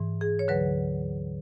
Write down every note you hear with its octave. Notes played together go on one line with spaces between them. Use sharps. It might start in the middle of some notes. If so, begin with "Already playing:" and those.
Already playing: G#2 E3
G#4
C#5
D2 D3 F#3 B4